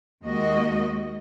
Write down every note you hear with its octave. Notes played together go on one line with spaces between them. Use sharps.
D#2 G#3 A#3 F#4 D#5